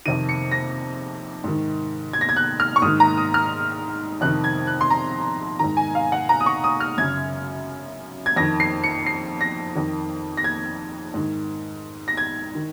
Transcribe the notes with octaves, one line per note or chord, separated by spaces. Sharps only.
F2 C3 D#3 D#7
C#7
A#6
G#2 D#3
G#6
A#6
G#6
F#6
F6
C#6
G#2 D#3 D#6
A#5
D#6
F6
F2 C3 D#3 F#6
G#6
F#6
C6
A#5
G#2 D#3 A#5
G#5
F5
F#5
A#5
D#6
C#6
D#6
F6
F#2 C#3 G#6
G#6
F2 D#3 A#6
C7
C#7
C7
A#6
F2 D#3
A#6
G#6
G#2 D#3
A#6
G#6
D#3